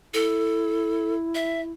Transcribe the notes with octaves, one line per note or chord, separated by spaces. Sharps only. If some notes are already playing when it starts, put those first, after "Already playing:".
E4 A4
E5